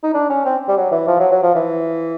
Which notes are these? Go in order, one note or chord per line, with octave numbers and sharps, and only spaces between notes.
D#4
D4
C#4
C4
G3
F#3
E3
F3
F#3
F#3
F3
E3